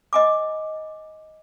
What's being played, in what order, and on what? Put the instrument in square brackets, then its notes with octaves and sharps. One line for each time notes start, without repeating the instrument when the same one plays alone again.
[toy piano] D#5 G#5 D6